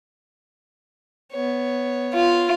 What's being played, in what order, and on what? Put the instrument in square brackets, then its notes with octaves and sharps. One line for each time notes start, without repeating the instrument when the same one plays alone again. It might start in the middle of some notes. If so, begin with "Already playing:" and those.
[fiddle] B3 C#5
[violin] F4